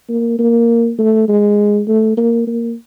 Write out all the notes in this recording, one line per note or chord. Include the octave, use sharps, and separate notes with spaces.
A#3
A#3
A3
G#3
A3
A#3
A#3